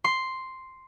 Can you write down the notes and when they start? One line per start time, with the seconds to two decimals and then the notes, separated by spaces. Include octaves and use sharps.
0.04 C6